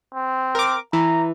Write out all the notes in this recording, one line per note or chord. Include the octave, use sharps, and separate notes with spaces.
C4
A#4 D6
E3 A#5